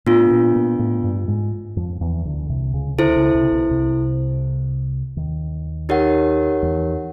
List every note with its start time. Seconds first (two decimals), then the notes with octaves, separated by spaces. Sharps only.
0.06 A2 A3 B3 D4 F4
0.30 A#2 A#3
0.55 A#2 A#3
0.79 A2 A3
1.04 G2 G3
1.28 G#2 G#3
1.76 F2 F3
2.01 E2 E3
2.25 D2 D3
2.49 C2 C3
2.73 C#2 C#3
2.98 D2 D3 E4 A4 C5
3.16 C#2 C#3
3.34 C2 C3
3.52 B1 B2
3.70 C2 C3
5.16 D#2 D#3
5.89 D#4 G4 A#4 C#5 F#5
6.63 E2 E3